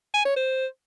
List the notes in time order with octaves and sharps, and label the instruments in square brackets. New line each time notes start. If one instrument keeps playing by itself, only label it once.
[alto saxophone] G#5
C#5
C5